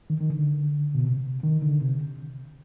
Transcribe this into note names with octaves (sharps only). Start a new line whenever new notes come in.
D#3
D#3
D3
B2
C3
D#3
D3
C3